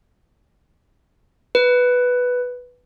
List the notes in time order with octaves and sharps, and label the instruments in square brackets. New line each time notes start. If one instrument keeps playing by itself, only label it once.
[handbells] B4